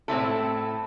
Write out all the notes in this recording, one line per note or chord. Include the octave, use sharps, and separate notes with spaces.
A2 C4 E4 A4